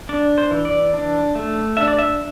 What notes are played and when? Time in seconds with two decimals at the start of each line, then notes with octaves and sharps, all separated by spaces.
0.09 D4 D5
0.38 C5
0.51 E3
0.65 D5
0.94 D4
1.35 A3
1.77 D4 E5
1.88 D5
1.98 E5